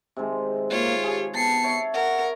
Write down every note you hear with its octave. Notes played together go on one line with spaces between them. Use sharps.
C3 D#3 G#3
A#3 F4 C#5
G4 G#4
B3 A5 C7 C#7
C#5 E5
A#4 F#5